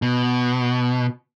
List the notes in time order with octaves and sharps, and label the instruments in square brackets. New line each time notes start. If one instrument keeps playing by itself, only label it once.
[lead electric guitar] B2